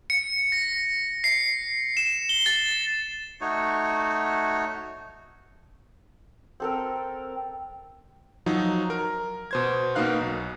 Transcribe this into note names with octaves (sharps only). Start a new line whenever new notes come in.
C#7
A#6
C7
E7
G7
A6
A3 D#4 F#4 C#5
C4 A4 A#4
F3 F#3 D#4
A#4
B2 C5 G#6
B2 A#3 B3 D#4 F5 F#6
B1